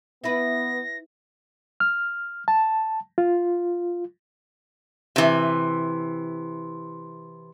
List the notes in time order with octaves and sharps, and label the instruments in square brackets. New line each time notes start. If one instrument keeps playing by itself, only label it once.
[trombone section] B3 [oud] E4 B4 [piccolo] A#6
[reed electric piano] F6
A5
F4
[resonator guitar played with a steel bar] C3 E3